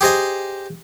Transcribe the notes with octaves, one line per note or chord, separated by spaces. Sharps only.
G4 G#4 C5 D#5 G#5